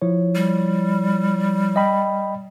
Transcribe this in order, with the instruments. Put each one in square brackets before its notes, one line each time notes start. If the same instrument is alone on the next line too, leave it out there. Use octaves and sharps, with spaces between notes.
[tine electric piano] F3 E4 C#5
[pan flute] G3
[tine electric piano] D#5 G5 B5